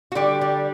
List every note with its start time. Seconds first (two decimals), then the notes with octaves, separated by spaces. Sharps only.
0.12 F#4
0.15 D3 G3 G4
0.41 G3